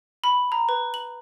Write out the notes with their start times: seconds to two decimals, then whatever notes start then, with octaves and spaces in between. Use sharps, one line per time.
0.24 B5
0.52 A#5
0.69 B4
0.94 F#7